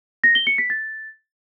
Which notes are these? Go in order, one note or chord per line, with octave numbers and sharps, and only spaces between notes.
A#6
G7
C#7
B6
A6